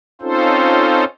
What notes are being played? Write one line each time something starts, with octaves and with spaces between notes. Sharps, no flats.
C4 C#4 D#4 F4 A4 C5